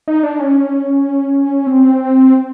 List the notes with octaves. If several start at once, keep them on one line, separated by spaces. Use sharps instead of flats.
D#4
D4
C#4
C4